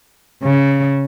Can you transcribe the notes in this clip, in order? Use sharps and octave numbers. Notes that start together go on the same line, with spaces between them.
C#3